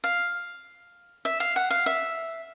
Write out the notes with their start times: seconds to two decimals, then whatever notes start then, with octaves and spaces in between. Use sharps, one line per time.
0.04 F5
1.25 E5
1.40 F5
1.56 F#5
1.70 F5
1.86 E5